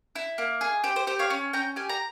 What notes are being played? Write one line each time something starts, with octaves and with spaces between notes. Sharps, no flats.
E4
A#3
G#4
G4 C5
C5
G4 C5
C#5 F5
C#4
C#4 G5 A#5
G4 G#5
A#5